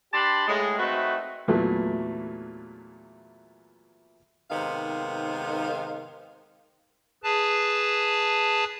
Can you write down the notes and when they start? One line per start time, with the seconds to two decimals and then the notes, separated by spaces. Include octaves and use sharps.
0.13 D4 G4 F#5 A5 B5 C6
0.47 A2 G#3
0.79 A3 C4 D#4 F#4 B4 E5
1.48 E2 A#2 E3 F#3 A3
4.51 G#2 C3 D#3 B3 F5
7.24 G#4 B4 A5